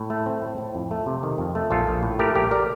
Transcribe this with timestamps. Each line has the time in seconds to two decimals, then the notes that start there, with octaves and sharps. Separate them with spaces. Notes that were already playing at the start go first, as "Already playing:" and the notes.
Already playing: A2
0.10 A3
0.26 C4
0.42 A2
0.58 A2
0.75 F2
0.91 A3
1.06 C3
1.23 D#3
1.38 F2
1.55 A3
1.70 A#1 F4 A4
1.87 A#1
2.03 A2
2.19 A3 G4 A#4
2.35 A#1 G4 A#4
2.51 A#4 D5